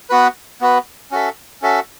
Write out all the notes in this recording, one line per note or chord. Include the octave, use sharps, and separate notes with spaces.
B3 F#4 B4
B3 F#4 B4
C#4 F#4 A4 E5
C#4 F#4 A4 E5